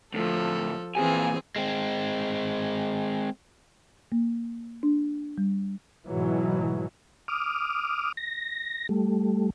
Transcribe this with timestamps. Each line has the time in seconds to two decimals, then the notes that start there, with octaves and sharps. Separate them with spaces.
0.14 D2 A2 F3 A4
0.97 A#2 E3 C4 G#4 G#5
1.56 G#3 C4
4.12 A#3
4.83 D4
5.38 G3
6.08 G#2 B2 E3 F#3
7.28 D6 D#6 F6
8.17 A#6
8.89 G3 A3